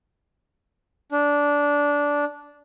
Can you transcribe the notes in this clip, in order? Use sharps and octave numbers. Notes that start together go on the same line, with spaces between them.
D4